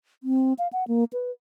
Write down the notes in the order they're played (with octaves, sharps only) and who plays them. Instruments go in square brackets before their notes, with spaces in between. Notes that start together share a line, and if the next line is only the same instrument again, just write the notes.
[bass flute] C4
F5
F#5
A#3
B4